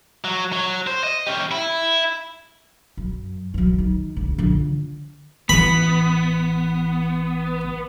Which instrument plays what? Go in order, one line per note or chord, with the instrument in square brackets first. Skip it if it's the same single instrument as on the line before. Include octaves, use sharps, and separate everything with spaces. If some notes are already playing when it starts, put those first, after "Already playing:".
[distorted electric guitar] F#3
F#3
C5
D#5
C#4 G4
E4
[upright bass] F#2
E3 F#3
D#3
D2
D3 F3
[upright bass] A1 E3 [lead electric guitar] B3 [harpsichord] B5